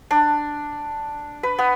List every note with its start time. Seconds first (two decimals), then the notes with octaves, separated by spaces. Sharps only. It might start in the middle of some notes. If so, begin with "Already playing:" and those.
0.11 D4
1.43 B4
1.59 B3